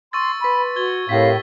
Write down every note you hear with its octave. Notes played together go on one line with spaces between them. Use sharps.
C6 C#6 E6 A6
B4 B5 C6
F#4 G#6 G7
A2 C4 G4 A#4 F5 B6